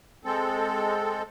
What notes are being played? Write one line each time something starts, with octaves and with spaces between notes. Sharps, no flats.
G#3 C4 A4